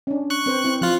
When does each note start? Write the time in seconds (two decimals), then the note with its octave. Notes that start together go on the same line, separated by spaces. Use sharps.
0.07 C#4 D4
0.30 C#6 F#6
0.46 C4 B4 C5
0.64 C4 E4
0.81 F3 F4 F#6